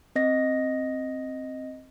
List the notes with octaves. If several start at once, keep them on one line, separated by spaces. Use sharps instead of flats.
C4 D#5 A#6